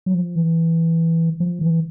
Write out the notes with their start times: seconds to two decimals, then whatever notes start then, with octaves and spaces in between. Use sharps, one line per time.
0.06 F#3
0.14 F3
0.36 E3
1.40 F3
1.61 E3